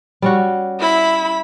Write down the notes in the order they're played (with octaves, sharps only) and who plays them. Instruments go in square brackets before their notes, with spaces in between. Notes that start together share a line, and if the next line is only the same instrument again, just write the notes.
[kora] G3 C#4 F#4
[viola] E4 B5